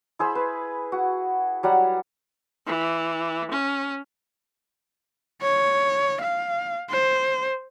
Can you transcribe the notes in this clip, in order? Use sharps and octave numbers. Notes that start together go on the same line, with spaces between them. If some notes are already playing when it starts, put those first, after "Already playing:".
E4 G#4 C5 B5
B4
F#4
F#3 G3 F#5
E3
C#4
C#5
F5
C5